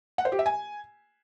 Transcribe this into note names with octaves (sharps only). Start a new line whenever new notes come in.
F#5
C5
G4
E5
G#5